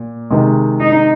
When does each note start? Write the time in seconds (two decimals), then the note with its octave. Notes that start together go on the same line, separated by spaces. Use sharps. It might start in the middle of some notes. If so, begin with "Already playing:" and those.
Already playing: A#2
0.31 C3 D#3 G#3
0.81 D#4